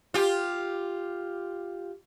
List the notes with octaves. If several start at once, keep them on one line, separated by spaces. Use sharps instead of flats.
F4 G4